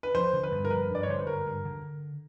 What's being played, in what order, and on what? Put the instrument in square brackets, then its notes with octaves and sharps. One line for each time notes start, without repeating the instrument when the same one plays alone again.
[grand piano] B4
[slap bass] F3 [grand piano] C5
[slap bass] D3
[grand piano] B4
[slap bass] G2
[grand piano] A#4
[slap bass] F3 [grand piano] B4
[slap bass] G2
[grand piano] D5
C#5
[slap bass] D3 [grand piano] C5
[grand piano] B4
[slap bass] G2 [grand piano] A#4
[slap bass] G2
D3